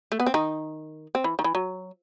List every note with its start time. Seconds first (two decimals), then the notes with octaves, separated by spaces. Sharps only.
0.12 A3
0.20 B3
0.27 C4
0.34 D#3 D#4
1.15 C4
1.24 E3
1.39 D#3
1.44 E3
1.55 F#3